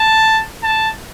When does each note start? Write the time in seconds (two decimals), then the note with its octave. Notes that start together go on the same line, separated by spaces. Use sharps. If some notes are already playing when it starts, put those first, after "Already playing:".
Already playing: A5
0.63 A5